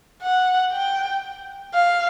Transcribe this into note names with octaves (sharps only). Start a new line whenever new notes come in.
F#5
G5
F5